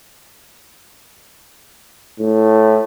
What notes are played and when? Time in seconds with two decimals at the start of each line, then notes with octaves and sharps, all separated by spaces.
2.20 A2